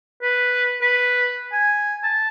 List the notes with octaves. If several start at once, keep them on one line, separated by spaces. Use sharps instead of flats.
B4
B4
G#5
A5